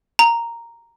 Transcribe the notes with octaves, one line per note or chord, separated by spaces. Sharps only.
A#5